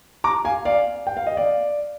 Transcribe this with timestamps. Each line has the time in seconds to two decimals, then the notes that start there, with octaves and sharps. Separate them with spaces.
0.24 A#5 D6
0.45 F5 G#5
0.65 D5 F5
1.07 G5
1.17 F5
1.27 D#5
1.37 D5 F5